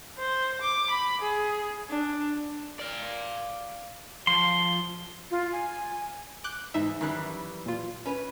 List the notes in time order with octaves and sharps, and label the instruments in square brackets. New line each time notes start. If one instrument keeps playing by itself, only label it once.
[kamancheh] C5
D6
B5
G#4
D4
[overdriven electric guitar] D5 F5
[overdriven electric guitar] F3 [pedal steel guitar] C6
[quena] F4
G#5
[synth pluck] D6 F#6 G6
[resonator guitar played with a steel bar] E2 [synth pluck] G#2 D#4 E5
[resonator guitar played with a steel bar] F#2 E3 G3 [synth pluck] D#3 F#6
[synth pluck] A#2 F4
[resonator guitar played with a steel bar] C#4 B4